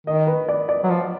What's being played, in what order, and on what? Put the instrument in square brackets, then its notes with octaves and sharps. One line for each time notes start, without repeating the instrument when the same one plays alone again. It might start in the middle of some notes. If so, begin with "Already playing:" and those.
[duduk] D#3 [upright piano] D#5
[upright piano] B4
D5
D5
[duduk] F#3
F3